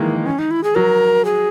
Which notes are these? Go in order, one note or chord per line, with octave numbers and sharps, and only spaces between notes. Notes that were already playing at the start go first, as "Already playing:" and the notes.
Already playing: D#3 E3 G#3 A#3
C#4
D#4
E4
G#4
F#3 A#4
G#4